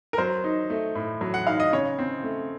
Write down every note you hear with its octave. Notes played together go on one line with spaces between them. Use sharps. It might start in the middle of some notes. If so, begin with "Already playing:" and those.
A#4
F#3 C5
D#4
A3
A2
F#3
F#5
D#4 F5
D#5
C#3 C#5
C4
A3